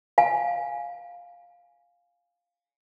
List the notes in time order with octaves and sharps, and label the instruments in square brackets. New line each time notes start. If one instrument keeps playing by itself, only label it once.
[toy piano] F5 G#5